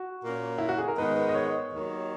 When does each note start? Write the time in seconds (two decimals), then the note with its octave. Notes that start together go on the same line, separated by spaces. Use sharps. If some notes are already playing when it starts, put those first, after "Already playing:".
Already playing: F#4
0.23 A#2 A#3 C#4
0.58 E4
0.69 F#4
0.78 G#4
0.88 A#4
0.98 G#2 D#3 G#3 B3 B4
1.29 D#5
1.35 C#5
1.72 D#2 D#3 F#3